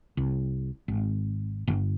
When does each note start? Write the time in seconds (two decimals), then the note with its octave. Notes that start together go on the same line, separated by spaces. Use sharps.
0.17 C2
0.88 G#1
1.68 G1